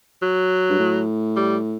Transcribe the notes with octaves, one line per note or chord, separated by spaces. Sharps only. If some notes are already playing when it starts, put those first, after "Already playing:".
F#3
G2
A2
G3